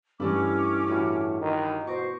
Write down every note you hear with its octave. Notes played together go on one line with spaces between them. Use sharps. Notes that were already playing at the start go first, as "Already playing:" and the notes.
G2 E3 A3 C#4 E4 D6
A2 F#4
D#3
B2 C5 C#6 D6 A#6